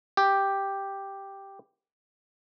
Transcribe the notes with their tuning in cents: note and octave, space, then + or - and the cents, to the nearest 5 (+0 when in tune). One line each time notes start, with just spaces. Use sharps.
G4 +0